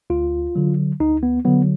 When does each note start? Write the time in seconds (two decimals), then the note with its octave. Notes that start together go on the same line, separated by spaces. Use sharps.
0.10 D2 F4
0.55 D3 F#3
1.00 D2 D#4
1.23 B3
1.45 D3 F#3 B3